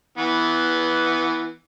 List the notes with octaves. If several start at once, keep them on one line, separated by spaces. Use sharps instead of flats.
E3 B3